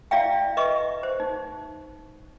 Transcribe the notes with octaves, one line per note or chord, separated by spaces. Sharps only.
E4 D5 E5 F5 G5
B4 D#5 E5 C#6
C5
D#4